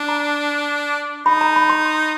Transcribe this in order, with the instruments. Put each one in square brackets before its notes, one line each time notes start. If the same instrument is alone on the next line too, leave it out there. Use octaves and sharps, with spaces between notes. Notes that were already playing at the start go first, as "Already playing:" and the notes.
Already playing: [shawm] D4
[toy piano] A#5
[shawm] D#4 [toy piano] B5
[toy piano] A#5
B5
C6